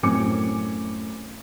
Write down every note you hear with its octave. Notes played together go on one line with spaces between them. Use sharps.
F#2 A2 C4 G#5 D6 C#7